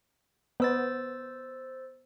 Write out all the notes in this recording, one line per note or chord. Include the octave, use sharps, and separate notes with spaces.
B3 C5 E6 A6